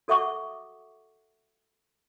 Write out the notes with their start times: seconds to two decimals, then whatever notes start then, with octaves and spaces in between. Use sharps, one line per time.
0.08 F#4 A4 E5 F#5 C#6 D6